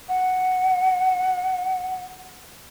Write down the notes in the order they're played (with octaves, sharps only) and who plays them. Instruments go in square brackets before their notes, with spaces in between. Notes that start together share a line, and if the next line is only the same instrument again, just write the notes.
[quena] F#5